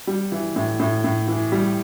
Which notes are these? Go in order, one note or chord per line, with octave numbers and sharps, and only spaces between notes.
G3
E3
A2
A2
A2
E3
G3